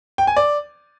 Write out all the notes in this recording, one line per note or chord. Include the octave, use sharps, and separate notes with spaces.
G5
G#5
D5